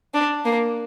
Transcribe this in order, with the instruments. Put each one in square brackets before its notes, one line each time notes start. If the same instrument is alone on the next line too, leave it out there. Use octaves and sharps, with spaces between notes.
[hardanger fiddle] D4
A#3